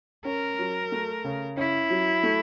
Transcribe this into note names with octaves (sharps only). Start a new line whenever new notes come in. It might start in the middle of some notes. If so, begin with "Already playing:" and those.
C#4 A#4
F#3
A3
C#3
C#4 E4
F#3
A3